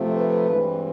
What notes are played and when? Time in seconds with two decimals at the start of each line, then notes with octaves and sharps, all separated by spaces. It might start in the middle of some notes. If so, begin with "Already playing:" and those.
Already playing: C3 F3 A3 C4
0.13 B4
0.49 G2 E3 G#3 C4